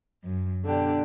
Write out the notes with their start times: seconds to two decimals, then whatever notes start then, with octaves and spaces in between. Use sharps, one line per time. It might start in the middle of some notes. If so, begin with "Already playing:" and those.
0.23 F#2
0.65 B2 D3 D4 G4